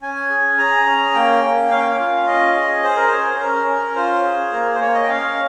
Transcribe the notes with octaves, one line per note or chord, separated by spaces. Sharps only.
C#4 G#5
G#4
G#4 A#5
C#4
A#3 G5
A#3
C#4 F5
G5
F5
F4
C#4 D#5
G#4
G#4 C5
A#4
C#4 C5
C#4 A#4
C#4
F4 C5
G#4
A#3 A#4
C5
A#3 C#5
D#5
G5
C#4 F5